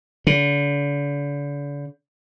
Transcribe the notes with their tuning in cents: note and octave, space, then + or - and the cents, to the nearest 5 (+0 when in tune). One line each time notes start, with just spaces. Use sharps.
D3 -40